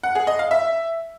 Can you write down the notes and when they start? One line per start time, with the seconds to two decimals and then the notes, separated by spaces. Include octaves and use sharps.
0.03 F#5
0.15 G#4
0.27 D#5
0.39 F5
0.51 E5